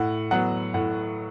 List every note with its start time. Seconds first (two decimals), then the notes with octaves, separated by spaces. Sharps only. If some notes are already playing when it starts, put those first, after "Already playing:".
Already playing: A2 F#5
0.31 F#3 B3 F#5
0.74 A2 F#5